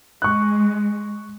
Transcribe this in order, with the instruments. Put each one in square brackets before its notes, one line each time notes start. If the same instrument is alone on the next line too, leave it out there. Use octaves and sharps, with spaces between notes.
[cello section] G#3 [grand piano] C#6 F#6